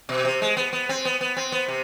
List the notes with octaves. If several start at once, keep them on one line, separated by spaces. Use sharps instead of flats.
B2
C3
G#3
B3
B3
C4
B3
B3
C4
B3
C3